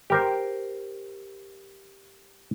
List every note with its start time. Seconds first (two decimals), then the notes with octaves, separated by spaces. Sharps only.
0.10 G4 A#4 C5